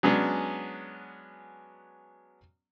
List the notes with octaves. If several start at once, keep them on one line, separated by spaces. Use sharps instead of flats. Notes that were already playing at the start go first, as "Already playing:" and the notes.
F#3 G#3 B3 C#4 D4